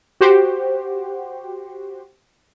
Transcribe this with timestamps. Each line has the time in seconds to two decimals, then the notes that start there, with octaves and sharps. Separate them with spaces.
0.21 F#4 G4 C5